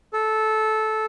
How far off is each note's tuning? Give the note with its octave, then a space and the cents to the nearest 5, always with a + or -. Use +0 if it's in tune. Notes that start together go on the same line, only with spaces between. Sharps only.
A4 -15